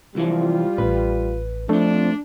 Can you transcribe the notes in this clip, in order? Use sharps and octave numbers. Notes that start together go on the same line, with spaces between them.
C2 E3 F3 G3 F4
A1 B4
F2 F3 A3 D4